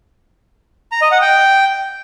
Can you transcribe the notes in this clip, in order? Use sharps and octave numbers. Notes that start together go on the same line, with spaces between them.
A#5
D#5
F#5
G5